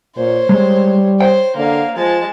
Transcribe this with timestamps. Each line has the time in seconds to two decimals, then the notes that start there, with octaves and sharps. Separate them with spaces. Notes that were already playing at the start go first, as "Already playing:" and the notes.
0.17 A#2 C5 C#5
0.49 G3 G#3
1.21 C5 C#5 G5
1.56 D3 A#3 F5
1.97 F3 G#3 A5